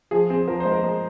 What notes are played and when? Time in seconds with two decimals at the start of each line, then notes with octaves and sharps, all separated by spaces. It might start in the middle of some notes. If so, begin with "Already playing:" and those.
0.11 F3 G#4
0.30 C4 G#4
0.48 F3 A#4
0.60 C5
0.65 G#3
0.72 A#4
0.84 G#3